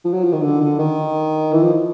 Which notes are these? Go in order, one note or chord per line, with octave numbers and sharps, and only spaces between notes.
F3
F#3
F3
D#3
D3
D3
D#3
E3
F3